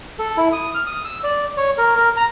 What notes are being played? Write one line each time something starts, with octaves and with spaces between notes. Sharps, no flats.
A4
E4
D#6
F6
D#6
E6
D5
C#5
A#4
A#4
A#5